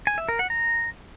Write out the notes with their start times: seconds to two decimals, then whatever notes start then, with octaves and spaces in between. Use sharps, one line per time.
0.07 G#5
0.18 E5
0.29 A#4
0.39 F#5
0.50 A#5